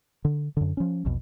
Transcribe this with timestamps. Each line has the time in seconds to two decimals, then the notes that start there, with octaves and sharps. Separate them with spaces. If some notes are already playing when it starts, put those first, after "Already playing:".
0.25 D3
0.57 F#2 D3
0.77 F3 C#4
1.05 A#1 E2 B2